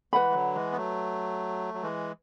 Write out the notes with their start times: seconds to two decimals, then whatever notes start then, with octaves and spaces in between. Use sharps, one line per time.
0.13 E3 G#3 B4 F#5 B5
0.30 G#3
0.34 D3 F#3
0.55 E3 G#3
0.72 B3
0.76 F#3 A3
1.74 F#3
1.82 E3 G#3